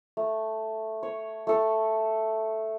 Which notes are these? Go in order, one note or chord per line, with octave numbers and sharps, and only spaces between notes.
A3
C#5
A3 A4